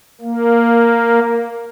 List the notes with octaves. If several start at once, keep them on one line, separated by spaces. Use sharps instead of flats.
A#3